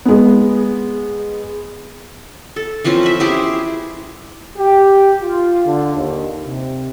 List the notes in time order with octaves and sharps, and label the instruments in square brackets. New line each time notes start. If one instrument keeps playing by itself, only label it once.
[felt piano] G#3 B3
[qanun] A4
E3 F3 C4 C#4
B4 E5
E4 G4 G#4 C5
[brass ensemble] G4
F4
D3
D#2
C3